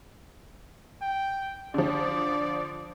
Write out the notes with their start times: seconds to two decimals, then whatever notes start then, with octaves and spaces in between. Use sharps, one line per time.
1.02 G5
1.74 D3 F3 D5